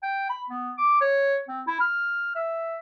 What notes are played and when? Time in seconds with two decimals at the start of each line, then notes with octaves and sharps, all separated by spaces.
0.03 G5
0.29 B5
0.50 B3
0.78 D6
1.01 C#5
1.48 C4
1.67 E4
1.80 F6
2.35 E5